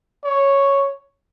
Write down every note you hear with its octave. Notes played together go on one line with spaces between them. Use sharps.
C#5